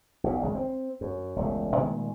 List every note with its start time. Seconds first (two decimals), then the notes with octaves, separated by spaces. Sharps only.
0.24 B1 A#2
0.42 G#1 C#2 C#3 G#3
0.55 C4
1.01 F#2
1.36 E1 C#2 A3
1.77 A#2 D#3 G#3 A3